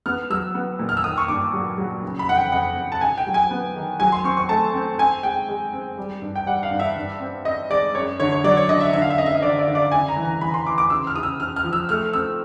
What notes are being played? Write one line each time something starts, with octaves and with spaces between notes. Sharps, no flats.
B3 F6
F#3 E6
B3
A#2
F6
E6
D#3 D#6
C#6
G2 D6
F#3
F#3
C#3
B5
F2 F#5
G5
F2 F#5
F2
A5
C3 G#5
G5
F#3
G#5
B3
D#3
F#3 G#5
C6
C4 C#6
C#6
A3 A5
C4
C4 G#5
G#3 G5
G#3
C4
G3
G2
G5
G3 F#5
F5
G2
E5
G2
C4
C4 D#5
G#3 D5
F#2 C#5
D3 C#5
C#5
F#3 D5
C#5
D3 D#5
E5
D3 E5
F5
E5
F#2 D#5
E5
D#5
D3 D5
D5
D3
D5
C#3 G#5
A#5
E3
A#5
E3 B5
C6
E3 D6
D6
C#3 E6
F6
C#3 D#6
E6
C#3 F6
F6
F3
E6
A3 F6
C4 E6